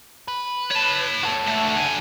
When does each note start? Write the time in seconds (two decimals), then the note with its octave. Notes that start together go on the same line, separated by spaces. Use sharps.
0.28 B4
0.71 C#5 A5
1.23 F#4 A4
1.47 D3 A3
1.75 D3 G#5